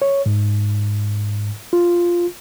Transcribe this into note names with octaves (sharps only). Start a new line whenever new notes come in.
C#5
G#2
F4